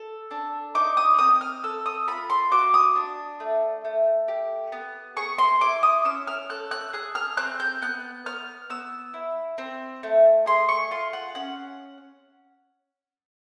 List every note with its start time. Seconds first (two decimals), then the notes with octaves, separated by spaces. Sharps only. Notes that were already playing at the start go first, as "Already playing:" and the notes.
Already playing: A4
0.31 D4
0.75 D#4 D6
0.97 D#6
1.18 C4 D#6
1.41 F6
1.64 A4 E6
1.86 D#6
2.08 F4 B5
2.30 C6
2.51 F#4 D6
2.74 D#6
2.96 D4
3.40 A3
3.85 A3
4.28 G4
4.72 B3
5.17 G#4 C#6
5.38 C6
5.61 E4 D6
5.83 D#6
6.05 C#4 E6
6.27 F6
6.49 A4 F#6
6.71 F#6
6.93 G#4 F#6
7.15 F6
7.37 C4 F#6
7.60 G6
7.82 B3 F#6
8.26 B3 F6
8.70 B3 E6
9.14 E4
9.58 C4
10.03 A3
10.46 G#4 C6
10.69 C#6
10.91 F4 C6
11.13 F#5
11.35 C#4 F#5